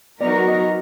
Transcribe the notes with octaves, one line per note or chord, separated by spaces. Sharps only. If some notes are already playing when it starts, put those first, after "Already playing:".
F#3 B3 D#4 F#4 A#4 D5
D#5